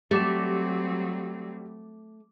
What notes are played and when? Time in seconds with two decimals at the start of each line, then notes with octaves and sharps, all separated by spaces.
0.11 F#3 G3 A3 C4 D6 E7